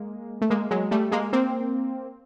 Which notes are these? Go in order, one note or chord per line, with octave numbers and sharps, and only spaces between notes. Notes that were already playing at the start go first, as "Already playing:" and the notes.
Already playing: G#3 A#3
A3
G#3 A#3
F#3 G#3
G3 A3
G#3 A#3
A#3 C4